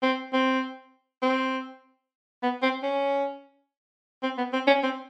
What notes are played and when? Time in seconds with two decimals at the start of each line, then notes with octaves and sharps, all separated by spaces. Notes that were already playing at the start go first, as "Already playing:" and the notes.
0.03 C4
0.33 C4
1.23 C4
2.43 B3
2.63 C4
2.83 C#4
4.23 C4
4.38 B3
4.53 C4
4.67 C#4
4.83 C4